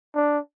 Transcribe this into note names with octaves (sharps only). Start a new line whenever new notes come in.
D4